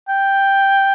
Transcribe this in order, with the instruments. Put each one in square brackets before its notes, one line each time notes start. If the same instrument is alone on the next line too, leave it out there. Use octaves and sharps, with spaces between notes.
[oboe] G5